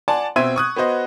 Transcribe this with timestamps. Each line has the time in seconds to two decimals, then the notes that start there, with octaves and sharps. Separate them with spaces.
0.08 D5 F#5 G#5 A5 C6
0.36 B2 C4 E5 C6 G#6 D#7
0.56 C#6 D#6 F#6
0.76 B3 F#4 C5 D#5